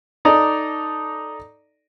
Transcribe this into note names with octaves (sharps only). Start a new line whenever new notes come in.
D#4 A4 D5 D#5 A#5 D6